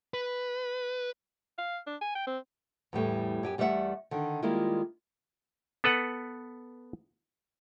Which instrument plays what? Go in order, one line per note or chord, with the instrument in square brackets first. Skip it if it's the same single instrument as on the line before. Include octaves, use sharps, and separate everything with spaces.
[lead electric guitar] B4
[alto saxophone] F5
D4
G#5
G5
C4
[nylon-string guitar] E2 A2 G3 A3
F#2 G4 G#5
E2 G3 A3 B3 E5 F#5
D3 D#3
D#3 G3 G#3 A#3 E4 F4
[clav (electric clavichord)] B3 A4 B4 F#5